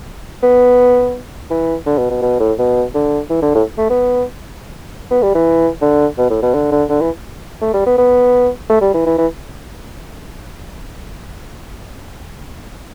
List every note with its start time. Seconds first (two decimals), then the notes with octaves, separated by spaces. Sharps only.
0.43 B3
1.50 E3
1.86 D3
1.98 B2
2.11 B2
2.22 B2
2.40 A2
2.59 B2
2.94 D3
3.30 E3
3.42 D3
3.55 A2
3.78 A3
3.90 B3
5.11 B3
5.23 G3
5.35 E3
5.81 D3
6.18 B2
6.30 A2
6.43 B2
6.54 D3
6.72 D3
6.90 D3
7.02 E3
7.62 A3
7.74 G3
7.86 B3
7.98 B3
8.69 A3
8.81 G3
8.94 E3
9.06 E3
9.18 E3